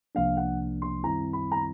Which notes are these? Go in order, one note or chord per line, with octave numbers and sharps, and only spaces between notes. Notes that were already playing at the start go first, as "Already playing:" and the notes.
C2 C3 F3 A#3 D4 F5
F#5
C6
F#2 D#3 G3 C4 E4 A#5
B5
A#5